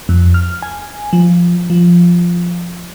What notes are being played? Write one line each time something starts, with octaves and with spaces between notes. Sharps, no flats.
F2
F6
G#5
F3
F3